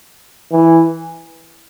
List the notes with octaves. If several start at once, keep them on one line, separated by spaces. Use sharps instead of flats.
E3